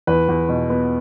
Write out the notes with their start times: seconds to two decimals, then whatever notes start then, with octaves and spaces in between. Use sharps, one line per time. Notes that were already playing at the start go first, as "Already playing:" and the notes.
0.07 E2 B4
0.28 E2
0.49 B2
0.70 B3